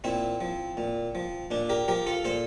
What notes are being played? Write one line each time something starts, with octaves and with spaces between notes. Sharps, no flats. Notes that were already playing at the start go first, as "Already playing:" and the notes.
A#2 C4 E4
F3
A#2
F3
A#2 D4
G4 A#4
F3 G4 A#4
F4 A4
A#2 A4 C5